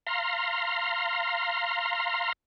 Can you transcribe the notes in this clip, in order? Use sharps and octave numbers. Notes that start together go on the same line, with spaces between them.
F5 A#5 C6